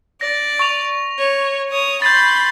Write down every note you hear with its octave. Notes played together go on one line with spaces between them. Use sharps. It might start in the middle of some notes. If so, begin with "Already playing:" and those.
D5 A#6
C#6 F7
C#5
C#5 D#6
B5 C6 G6 A6